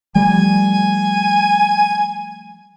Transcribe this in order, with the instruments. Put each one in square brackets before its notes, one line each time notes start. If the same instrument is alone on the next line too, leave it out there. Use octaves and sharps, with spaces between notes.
[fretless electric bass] F3 G3 A3 [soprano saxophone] G#5